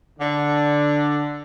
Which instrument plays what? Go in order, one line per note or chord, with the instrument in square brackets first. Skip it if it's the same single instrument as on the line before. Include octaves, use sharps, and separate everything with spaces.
[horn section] D3